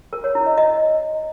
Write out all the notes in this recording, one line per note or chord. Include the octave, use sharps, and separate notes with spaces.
A#4
C#5
E4
D#5
D#5